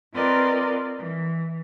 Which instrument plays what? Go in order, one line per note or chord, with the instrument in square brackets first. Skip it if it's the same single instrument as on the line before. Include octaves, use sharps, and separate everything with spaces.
[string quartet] C4 F4 A#4 B4 D5 D#5
E3